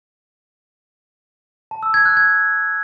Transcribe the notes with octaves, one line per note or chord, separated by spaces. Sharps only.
A5
E6
G#6
F#6
G#6